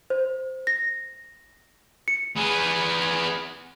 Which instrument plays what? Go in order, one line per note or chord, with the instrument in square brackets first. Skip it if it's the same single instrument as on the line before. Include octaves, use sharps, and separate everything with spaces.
[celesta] C5
A#6
C#7
[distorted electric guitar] B3 G#4